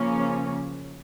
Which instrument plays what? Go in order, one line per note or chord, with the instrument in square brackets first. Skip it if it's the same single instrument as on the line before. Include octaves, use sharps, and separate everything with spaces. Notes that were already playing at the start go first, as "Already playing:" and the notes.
Already playing: [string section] C#3 F3 A#3 C#4